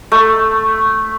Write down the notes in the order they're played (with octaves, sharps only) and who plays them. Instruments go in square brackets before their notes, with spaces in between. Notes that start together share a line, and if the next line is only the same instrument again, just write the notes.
[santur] A3